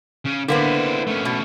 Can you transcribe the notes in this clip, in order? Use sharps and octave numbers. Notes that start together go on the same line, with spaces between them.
C#3 C#4
D3 A#3 B3 E4 C5
A3 C#4
B2